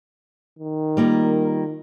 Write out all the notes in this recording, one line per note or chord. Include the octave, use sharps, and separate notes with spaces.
D#3
G3 A#3 F4